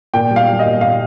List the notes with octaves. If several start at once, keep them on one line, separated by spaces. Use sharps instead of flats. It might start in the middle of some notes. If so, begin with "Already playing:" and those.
A#2 G5
G3
F5
G3
D#5
A#2
A#2 F5